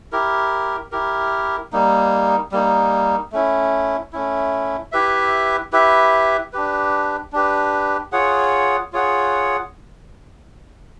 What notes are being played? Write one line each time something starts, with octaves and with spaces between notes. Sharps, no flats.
E4 G4 A#4
E4 G4 A#4
G3 A#3 D#4
G3 A#3 D#4
A3 C#4 E4
A3 C#4 E4
E4 G4 B4 E5
E4 G4 B4 E5
D4 G4 B4
D4 G4 B4
F4 G#4 C#5 F#5
F4 G#4 C#5 F#5